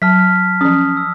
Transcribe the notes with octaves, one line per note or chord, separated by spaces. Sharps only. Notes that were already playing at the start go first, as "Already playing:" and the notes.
F#3 A5 F6 B6
F3 C#4 D#6
E6